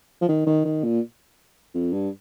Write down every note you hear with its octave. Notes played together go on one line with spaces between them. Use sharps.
F3
D#3
D#3
D#3
A#2
F2
G2